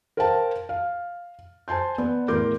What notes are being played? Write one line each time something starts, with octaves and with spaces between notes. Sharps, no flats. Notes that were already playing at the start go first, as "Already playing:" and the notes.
A#4 C5 F5 G5 A5
F5
C5 G#5 A5 C6 G6
B3 D5
E2 A2 A#4 C6 D6 G6